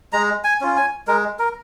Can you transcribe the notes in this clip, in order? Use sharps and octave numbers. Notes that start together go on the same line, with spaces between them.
G#3 A#5
G#5
C#4 F4
G#5
G#3 A#4
A#4